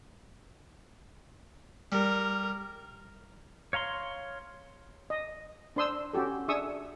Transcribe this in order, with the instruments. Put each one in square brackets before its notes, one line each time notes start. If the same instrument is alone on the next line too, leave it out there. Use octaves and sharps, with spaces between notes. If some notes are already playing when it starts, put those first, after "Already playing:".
[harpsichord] G3 [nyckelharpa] A#4
[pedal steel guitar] C#5 F5 A#5 C6
[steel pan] D#5
D4 C5 C6 D#6 E6
C#4 F#4 G4 A4
D4 G#4 E5 C#6 D#6 E6